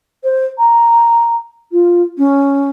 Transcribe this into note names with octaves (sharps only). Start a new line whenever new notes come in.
C5
A#5
F4
C#4